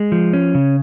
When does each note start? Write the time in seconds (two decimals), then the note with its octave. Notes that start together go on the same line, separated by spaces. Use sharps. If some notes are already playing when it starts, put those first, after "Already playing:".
Already playing: G#3
0.12 F3
0.33 C#4
0.55 C#3